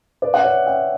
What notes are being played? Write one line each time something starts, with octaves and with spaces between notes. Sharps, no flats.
B4 D5
F#5
C#5 E5
E5 G5